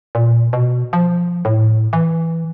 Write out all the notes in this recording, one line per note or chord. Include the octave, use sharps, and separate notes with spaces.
A#2
B2
F3
A2
E3